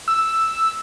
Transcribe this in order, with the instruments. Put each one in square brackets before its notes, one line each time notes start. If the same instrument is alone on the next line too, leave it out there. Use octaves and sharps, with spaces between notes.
[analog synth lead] E6